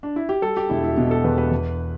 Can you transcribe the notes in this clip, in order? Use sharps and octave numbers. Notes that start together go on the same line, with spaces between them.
D4
E4
G4
G3 A4
G4
E1 E4
E4
B2 E4
A4
E2 B4
B4
E2